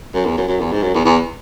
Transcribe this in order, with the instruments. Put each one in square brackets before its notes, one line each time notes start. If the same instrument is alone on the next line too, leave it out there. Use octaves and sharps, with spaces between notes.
[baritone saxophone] F#2
E2
F#2
F#2
E2
G#2
F#2
E2
E2